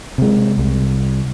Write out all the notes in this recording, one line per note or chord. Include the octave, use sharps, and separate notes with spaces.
C3 G#3
C2